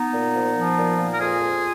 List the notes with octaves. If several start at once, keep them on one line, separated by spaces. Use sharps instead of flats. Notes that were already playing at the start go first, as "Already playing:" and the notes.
Already playing: B3 D#4
A#2
F3
F3
A#2
A#2
A#4
F2 F4 G#4
F2